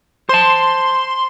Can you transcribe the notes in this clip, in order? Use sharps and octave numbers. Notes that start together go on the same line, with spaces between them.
C5 A5 C6